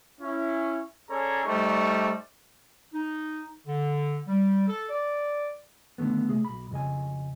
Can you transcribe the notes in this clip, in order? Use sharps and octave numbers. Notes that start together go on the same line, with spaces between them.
C#4 E4
C#4 G#4 A4 C#5 D5 A#5
G3 A3 D#4 C5 D5 C#6
D#4
D3
G3
A4
D5
D3 D#3 A3 B3
C3 A3 G#4
B1 B5
F2 C#3 D#5 G#5